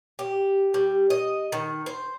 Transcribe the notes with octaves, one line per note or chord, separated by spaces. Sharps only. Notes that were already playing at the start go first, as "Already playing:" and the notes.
G4
G3
D#5
D#3
C5